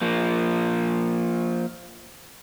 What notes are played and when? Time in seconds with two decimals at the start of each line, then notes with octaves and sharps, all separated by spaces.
0.02 F3 A#3